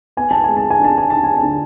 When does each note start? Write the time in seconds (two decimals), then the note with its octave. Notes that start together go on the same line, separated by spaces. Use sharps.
0.17 B3 G#5
0.31 A5
0.44 G#3 G#5
0.57 A5
0.71 G#5
0.80 D4 A5
0.98 G#5
1.10 D4 A5
1.24 G#5
1.37 A5
1.43 D3